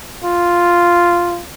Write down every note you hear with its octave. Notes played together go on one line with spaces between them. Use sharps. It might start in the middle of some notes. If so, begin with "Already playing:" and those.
F4